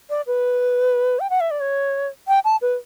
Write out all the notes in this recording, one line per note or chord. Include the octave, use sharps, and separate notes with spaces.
D5
B4
G5
F#5
E5
D5
C#5
G5
A5
B4